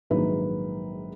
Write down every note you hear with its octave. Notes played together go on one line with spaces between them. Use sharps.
A#1 G#2 D#3 F#3 A#3 B4